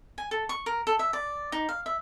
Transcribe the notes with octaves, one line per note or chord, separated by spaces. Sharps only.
G#5
A4
C#6
A#4
A4
E5
D5
D#4
F5
E5